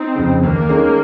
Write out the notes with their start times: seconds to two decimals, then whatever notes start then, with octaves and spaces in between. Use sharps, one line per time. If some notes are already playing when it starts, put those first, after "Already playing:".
Already playing: C4 D#4
0.15 F2 C#3
0.43 D#2 A#3
0.69 D#3 G#3 C#4 G#4